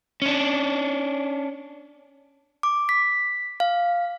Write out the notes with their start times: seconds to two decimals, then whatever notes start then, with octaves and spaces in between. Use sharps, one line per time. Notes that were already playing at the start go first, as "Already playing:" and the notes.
0.22 C#4 D4
2.63 D6
2.89 B6
3.60 F5